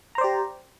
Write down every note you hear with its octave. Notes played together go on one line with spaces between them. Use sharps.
G4 C5 D5 A#5